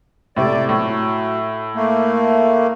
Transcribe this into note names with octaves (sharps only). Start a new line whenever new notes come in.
A2 C3 A3 D5
A2 F#3
A3 A#3